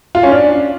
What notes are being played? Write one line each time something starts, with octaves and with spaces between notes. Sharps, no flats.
F4
C#4
D4